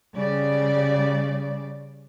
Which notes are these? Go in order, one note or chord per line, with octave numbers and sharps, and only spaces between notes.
C#3 G3 D5